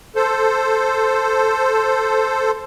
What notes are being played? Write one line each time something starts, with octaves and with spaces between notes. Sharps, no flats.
A4 C5